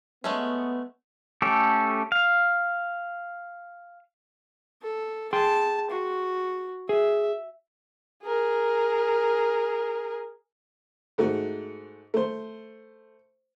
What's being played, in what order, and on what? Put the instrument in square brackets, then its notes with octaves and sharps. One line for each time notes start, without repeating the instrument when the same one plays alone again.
[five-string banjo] G#3 A3 C#4 [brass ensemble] B3
[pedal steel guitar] A3 C#4 G4 A4
F5
[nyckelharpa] A4
[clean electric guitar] G#4 G5 C6 [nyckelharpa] A5
[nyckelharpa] F#4
[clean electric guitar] G#4 [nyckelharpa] E5
[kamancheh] G#4 A#4
[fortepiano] G#2 A3 F#4
A3 C5